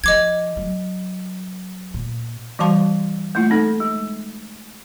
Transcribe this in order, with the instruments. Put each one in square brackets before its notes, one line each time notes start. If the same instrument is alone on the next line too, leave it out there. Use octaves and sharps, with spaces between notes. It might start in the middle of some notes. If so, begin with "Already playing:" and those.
[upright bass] F3 [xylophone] D#5 D6 G#6
[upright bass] F#3
A#2
[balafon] E3 G3 F#4 F5 A5 C6
A3 A#3 E4 F4
C4 D#4 A4
G#3